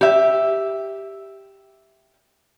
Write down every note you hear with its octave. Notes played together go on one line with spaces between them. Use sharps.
G4 E5